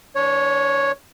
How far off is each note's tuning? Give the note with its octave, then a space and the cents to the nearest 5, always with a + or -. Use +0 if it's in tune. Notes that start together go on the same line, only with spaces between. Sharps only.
E3 -35 D4 -35 C#5 +0